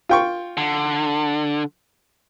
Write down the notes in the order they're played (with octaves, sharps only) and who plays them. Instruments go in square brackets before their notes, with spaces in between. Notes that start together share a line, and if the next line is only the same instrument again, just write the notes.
[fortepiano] F4 G5 C#6
[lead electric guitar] D3